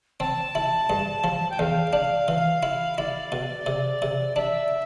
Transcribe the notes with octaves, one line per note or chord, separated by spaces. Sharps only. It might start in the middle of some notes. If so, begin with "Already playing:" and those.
C4 A5
E4
G2
F3
G5
E2 F5
D4
E3
E4
E4 D5
B2
C3
C3
D4 E5